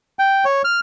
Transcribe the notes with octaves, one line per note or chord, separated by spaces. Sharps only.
G5
C#5
F6